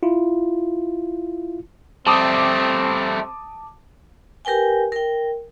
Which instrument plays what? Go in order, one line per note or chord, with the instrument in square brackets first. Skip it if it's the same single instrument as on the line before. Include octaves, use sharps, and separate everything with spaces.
[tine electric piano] E4 F4
[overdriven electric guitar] G3 A3 [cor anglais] C4 [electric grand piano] A5 D6 D#6
[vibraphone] G4 A#4 B4 G5 G#5
A#4 G5